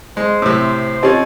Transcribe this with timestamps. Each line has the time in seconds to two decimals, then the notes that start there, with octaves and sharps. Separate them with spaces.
0.17 G#3 C5
0.42 A2 C3
1.03 F2 C4 C#4 D#4 G4 C5 D#5